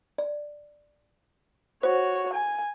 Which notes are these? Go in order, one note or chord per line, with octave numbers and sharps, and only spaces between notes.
D5
F#4 C5 C#5
G#5